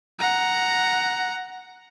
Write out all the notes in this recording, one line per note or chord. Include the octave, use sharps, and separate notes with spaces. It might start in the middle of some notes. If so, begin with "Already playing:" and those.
F#5 A#5